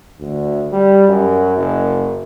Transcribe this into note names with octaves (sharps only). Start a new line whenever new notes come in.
D2
G3
F#2
F#1